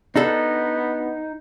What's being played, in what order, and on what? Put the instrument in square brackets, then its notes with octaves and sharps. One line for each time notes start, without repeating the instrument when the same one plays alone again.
[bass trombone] B3 [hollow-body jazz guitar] D4 F#4 A4 [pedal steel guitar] D#4